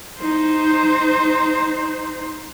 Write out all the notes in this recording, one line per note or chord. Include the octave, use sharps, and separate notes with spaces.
D#4 C5